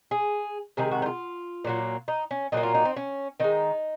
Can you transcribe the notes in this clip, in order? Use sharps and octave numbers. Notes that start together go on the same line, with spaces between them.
G#4
C3 D#3 G#3 G#4
F#4
D#4
F4
A#2 F#3 A#3
D#4
C#4
A#2 F#3 A#3 D#4
F4
D#4
C4
C#4
D#3 G#3 D#4